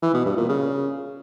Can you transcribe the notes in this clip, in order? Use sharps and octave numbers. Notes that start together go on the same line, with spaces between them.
E3
B2
G2
A#2
C#3